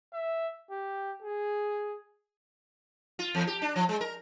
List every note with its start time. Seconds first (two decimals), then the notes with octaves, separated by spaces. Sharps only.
0.13 E5
0.71 G4
1.23 G#4
3.19 F4
3.35 E2
3.47 G4
3.62 D4
3.76 F3
3.89 G#3
4.01 A#4